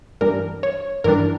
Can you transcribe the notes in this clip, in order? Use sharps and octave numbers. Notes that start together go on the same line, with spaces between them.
G2 E3 G3 D4 A#4
C#5
G2 E3 G3 D4 A#4